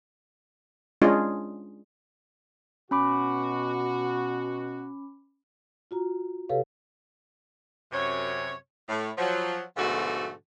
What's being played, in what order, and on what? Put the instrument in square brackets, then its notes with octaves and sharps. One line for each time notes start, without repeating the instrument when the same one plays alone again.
[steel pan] G#3 C#4 D4 F4 G#4 D#5
[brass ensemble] B2 F#4 [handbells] C#4 B5 D6
[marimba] F4 F#4 A#5
C3 G4 A4 B4 C#5 F5
[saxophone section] F#2 C3 C#5
A2
F3 F#3
G#2 B2 D3 F3 A3 F#4